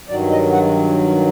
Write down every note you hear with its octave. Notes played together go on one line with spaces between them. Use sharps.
G2 D#3 F#3 D5
D#5
F#5